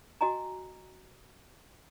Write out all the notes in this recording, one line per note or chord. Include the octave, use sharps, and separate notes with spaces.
F#4 D#5 G#5 A#5